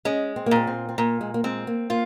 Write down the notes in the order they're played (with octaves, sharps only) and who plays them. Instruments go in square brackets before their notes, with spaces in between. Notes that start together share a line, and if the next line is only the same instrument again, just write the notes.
[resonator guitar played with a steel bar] G#3 [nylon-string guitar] C#4
[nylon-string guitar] C4
A#3
[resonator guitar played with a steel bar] A#2 [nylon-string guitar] C4
[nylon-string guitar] C4
C4
[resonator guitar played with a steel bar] A#2 [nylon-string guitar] A#3
[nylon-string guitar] G#3
A#3
[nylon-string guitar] G#3 [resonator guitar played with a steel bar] C4
[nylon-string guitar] A#3
[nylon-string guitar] A#3 [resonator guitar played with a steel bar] F4